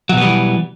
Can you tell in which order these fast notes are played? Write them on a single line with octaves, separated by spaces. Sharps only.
F#3 B2 B3 G3 E3